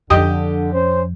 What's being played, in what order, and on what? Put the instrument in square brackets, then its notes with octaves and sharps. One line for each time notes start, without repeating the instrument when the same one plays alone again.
[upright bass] F2 [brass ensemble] D3 [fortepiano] G4 D#5
[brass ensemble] C#4 C5